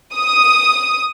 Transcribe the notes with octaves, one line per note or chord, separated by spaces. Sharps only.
D#6